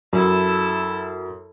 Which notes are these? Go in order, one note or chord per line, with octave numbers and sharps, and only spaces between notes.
F#2 E4 A4